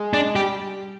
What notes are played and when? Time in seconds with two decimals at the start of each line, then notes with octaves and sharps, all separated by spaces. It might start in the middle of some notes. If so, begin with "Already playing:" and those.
Already playing: G#3
0.13 D4
0.35 G3 G4